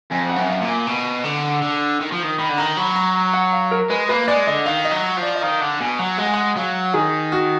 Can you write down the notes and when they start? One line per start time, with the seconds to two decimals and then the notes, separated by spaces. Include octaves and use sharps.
0.11 F2 G#5
0.29 F#5
0.36 F#2
0.48 F5
0.61 A#2
0.68 G#5
0.87 B2
1.24 D3
1.62 D3
2.01 D#3
2.12 F3
2.22 D#3
2.39 D#3 B5
2.49 D3
2.58 D#3 A#5
2.77 F#3 B5
2.96 A#5
3.15 A#5
3.33 F#5
3.52 F5
3.71 A#4
3.90 G#3 B4
4.09 A#3 B4
4.28 G#3 D5
4.47 D3 D#5
4.66 D#3 F5
4.85 D#5
4.91 F#3
5.17 F3
5.23 D5
5.35 D#5
5.42 D#3 F5
5.61 D3 F#5
5.80 B2 G#5
5.99 F#3 F#5
6.18 G#3 F#5
6.26 G#5
6.34 F#5
6.56 F#3 F5
6.94 D#3 G#4
7.32 F#4